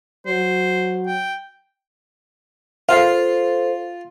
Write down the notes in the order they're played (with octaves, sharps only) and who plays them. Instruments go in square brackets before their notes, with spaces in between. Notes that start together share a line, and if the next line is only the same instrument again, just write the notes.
[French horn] F#3 [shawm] C5
[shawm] G5
[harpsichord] F4 [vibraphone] A4 C5 [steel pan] F5